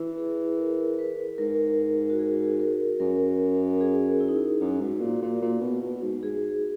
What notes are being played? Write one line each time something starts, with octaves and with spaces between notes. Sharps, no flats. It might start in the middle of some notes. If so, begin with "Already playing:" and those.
Already playing: E3 E4
G#4
A#4
B4
G#2 A#4
F#4
G#4
A#4
F#2 A#4
G#4
E4
D#4
E4
F#2 F#4
G#2
A#2
A#2
A#2
B2
B2
G#2
G#2 G#4